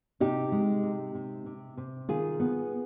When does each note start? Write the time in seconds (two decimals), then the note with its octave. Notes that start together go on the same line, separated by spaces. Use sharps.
0.20 C3 D#4 G4
0.52 G#3
0.83 C3
1.15 C3
1.46 C3
1.77 C3
2.09 D#3 F4 G#4
2.40 B3